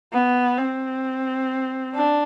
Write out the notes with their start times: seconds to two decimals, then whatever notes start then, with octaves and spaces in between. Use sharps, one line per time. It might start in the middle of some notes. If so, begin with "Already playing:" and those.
0.13 B3
0.58 C4
1.95 D4